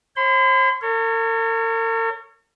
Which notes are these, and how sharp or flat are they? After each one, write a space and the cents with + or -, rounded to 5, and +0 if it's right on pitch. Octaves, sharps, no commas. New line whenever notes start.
C5 +45 C6 -45
A#4 -45 C#5 +0